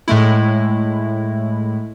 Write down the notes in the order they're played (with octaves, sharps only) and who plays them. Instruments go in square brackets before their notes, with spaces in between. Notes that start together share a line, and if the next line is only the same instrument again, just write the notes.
[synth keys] A2 G#3 A3 E4